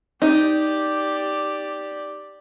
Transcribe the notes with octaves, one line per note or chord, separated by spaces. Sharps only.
D#4 G4 D5